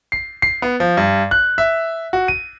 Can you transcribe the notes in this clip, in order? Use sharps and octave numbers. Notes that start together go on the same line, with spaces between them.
C7
C7
B3
F3
G2
F#6
E5
F#4
D#7